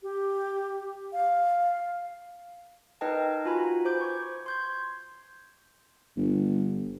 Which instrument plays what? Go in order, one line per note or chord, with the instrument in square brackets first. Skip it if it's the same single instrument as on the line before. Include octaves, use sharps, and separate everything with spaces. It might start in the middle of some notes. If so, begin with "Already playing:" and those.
[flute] G4
F5
[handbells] D#4 A#4 B4 D#5 G5 A5
F4 F#4 B4 G#5 A#5 B5
C5 D6 G6
C#6 G#6
C6 G6 G#6
[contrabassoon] G1